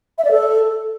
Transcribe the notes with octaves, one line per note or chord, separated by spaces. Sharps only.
E5
D5
A4